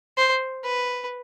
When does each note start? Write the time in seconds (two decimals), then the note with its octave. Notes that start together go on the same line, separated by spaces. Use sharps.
0.17 C5
0.64 B4